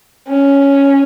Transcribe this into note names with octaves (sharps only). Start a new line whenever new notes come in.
C#4